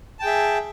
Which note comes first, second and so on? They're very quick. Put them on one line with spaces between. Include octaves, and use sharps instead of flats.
A5 G5 G#4 E5